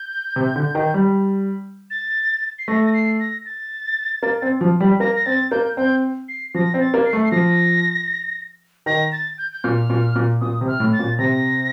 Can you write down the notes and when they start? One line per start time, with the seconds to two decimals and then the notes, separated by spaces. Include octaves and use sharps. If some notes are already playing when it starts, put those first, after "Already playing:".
Already playing: G6
0.36 C3
0.56 D3
0.75 D#3
0.94 G3
1.90 A6
2.59 C7
2.68 A3 A#6
2.84 A#6
2.94 C7
3.20 A#6
3.46 A6
4.23 A#3
4.42 C4
4.61 F3
4.80 G3
5.00 A#3 A#6
5.16 A#6
5.26 C4 A6
5.51 A#3 G6
5.77 C4 G6
6.29 C7
6.55 F3 A#6
6.74 C4
6.80 A6
6.94 A#3
7.06 C7
7.13 A3
7.25 C7
7.32 F3 A#6
8.86 D#3 A#6
9.12 A6
9.38 G6
9.52 G6
9.64 A#2 F6
9.90 A#2
10.16 A#2
10.41 A#2 D#6
10.61 C3
10.68 F6
10.80 A2
10.93 A6
10.99 A#2
11.19 C3 A#6